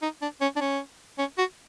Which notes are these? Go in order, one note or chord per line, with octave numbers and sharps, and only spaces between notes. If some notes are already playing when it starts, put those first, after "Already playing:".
D#4
D4
C#4
D4
C#4
C#4
F#4